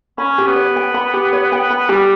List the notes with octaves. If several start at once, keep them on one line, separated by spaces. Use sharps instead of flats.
C#4 B5
G4
B3
C#5
G5
B5
G4
C#5
G5
B5
G3 G4